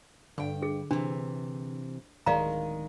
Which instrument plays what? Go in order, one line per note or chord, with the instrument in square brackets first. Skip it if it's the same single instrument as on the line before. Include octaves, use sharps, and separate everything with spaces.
[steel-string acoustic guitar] G2 G5 [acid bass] D3
[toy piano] G#4
[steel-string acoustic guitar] C3 E3 [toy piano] D4
[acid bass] D1 [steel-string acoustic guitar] D#3 G#3 [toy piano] D5 F5 A#5